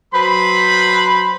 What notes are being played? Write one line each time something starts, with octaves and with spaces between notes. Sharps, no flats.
F#3 B4 C5 B5